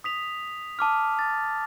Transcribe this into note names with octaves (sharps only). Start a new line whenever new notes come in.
D#6 B6 F7
A5 D6 F6
A6